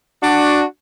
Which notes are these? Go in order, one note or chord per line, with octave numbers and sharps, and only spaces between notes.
D4 F#4